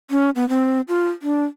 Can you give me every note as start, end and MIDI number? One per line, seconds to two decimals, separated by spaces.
0.10 0.30 61
0.36 0.48 59
0.49 0.81 60
0.88 1.09 65
1.22 1.44 62